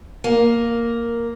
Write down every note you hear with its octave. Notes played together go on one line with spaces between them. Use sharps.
A#3